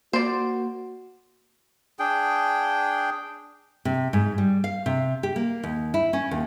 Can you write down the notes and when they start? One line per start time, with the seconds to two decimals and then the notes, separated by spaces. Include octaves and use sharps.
0.13 A#3 F#4 C5 D5
1.99 D4 G#4 G5
3.85 C3
4.13 G#2
4.38 G3
4.64 F5
4.86 C3
5.23 G4
5.36 A#3
5.63 D#2
5.94 E4
6.13 C#4
6.31 D#2